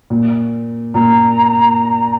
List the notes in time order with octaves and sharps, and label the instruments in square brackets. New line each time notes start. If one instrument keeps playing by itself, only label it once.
[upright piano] A#2
[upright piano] A#2 [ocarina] A#5